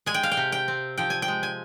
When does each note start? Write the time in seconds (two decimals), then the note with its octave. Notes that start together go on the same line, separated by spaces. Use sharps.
0.06 G#3 G#5
0.14 G5
0.23 F5
0.32 G5
0.37 C3
0.52 G5
0.68 C4
0.97 F3 G5
1.10 G#5
1.22 G5
1.28 G#3
1.43 G#5